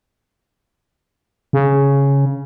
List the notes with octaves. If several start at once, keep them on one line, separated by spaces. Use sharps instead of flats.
C#3